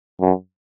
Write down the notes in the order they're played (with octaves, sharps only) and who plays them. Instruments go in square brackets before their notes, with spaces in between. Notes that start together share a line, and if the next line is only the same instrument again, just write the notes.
[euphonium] F#2